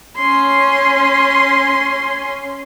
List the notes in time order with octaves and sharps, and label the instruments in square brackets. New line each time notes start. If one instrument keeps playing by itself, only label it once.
[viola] C#4 C6